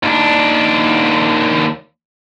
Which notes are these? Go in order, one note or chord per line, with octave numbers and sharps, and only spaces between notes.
D#2 D4